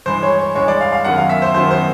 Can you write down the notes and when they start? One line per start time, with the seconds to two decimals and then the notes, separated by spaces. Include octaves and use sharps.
0.06 G2 E3 G#3 C5
0.23 C#5
0.39 C#5
0.55 G2 E3 G#3 C#5
0.68 D5
0.81 F5
0.92 F5
1.05 F#2 D#3 F#3 B3 F#5
1.18 F5
1.29 E5
1.42 C5
1.54 F#2 D#3 F#3 B3 C5
1.71 C5